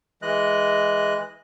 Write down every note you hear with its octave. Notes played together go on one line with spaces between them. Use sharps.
E3 G#3 D#5 F#6